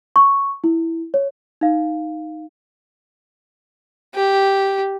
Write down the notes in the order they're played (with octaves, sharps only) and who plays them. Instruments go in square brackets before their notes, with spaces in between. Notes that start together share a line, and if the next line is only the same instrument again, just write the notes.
[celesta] C#6
E4
C#5
D#4 F5
[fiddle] G4